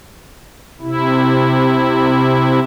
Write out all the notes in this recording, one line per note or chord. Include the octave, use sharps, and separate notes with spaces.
C3 E4